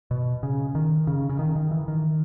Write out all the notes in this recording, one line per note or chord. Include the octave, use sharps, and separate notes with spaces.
B2
C#3
D#3
C#3
C#3
D#3
D#3
E3
D#3